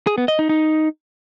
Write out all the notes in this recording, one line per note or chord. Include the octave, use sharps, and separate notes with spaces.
G#4
B3
D#5
D#4
D#4